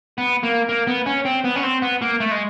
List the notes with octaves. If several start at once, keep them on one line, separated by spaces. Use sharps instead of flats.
B3
A#3
A#3
B3
C#4
C4
B3
C#4
C4
B3
A#3
A3
G#3